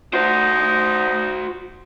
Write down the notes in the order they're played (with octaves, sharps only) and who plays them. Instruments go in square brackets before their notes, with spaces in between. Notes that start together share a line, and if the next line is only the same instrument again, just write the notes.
[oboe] D#4 [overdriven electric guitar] F#4 C5